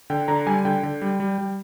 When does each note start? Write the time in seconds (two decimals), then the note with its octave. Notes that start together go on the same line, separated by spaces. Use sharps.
0.10 D3 G5
0.28 D3 A#5
0.46 G3 G#5
0.65 D3 G5
0.83 D3
1.02 G3
1.20 G3
1.38 G3